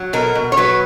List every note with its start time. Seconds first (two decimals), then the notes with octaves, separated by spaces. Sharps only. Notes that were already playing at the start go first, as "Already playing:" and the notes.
Already playing: F#3
0.13 B2 A#4
0.35 B2
0.52 C#5
0.57 F#3 B4